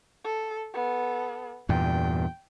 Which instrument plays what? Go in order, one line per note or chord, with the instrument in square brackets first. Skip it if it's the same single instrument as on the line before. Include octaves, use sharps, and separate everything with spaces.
[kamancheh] A4
B3 A4
[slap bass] E2 G2 A#2 [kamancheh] G5